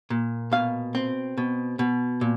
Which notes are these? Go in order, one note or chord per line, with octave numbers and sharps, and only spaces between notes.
A#2
B2 F5
C4
B2
B2
A#2